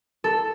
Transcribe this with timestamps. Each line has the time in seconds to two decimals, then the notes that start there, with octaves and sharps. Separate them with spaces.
0.24 A4